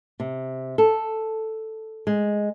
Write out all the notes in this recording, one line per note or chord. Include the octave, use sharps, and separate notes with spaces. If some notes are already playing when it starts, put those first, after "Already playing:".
C3
A4
G#3